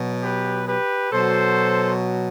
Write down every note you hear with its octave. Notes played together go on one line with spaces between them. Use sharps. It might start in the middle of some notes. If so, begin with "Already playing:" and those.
Already playing: B2 F#3
G4 B4
G4 B4
B2 F#3 A4 C5